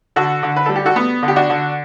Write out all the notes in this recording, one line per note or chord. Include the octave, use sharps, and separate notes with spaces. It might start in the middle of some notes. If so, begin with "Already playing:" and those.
D3 F#4 A4
D3
B4
G3 A4
G4
F#4 A4
B3
D3
G4
D4 F#4
D3